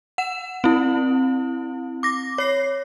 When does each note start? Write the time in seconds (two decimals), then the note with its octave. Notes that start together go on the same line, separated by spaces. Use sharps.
0.18 F#5 E7
0.64 C4 E4
2.03 D6 A#6
2.38 C#5 C7